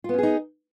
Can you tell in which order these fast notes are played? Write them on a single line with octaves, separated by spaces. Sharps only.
F4 B3 C#4 G#4 D#4